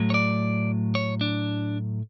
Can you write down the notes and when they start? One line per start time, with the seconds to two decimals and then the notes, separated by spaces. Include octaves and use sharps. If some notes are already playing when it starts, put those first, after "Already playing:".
Already playing: A2 F#3 A3
0.10 C#5
0.14 D5
0.95 C#5
1.21 D4